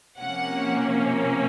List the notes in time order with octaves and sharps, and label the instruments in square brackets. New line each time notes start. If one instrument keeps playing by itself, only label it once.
[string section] C3 F3 A#3 C#4 F#5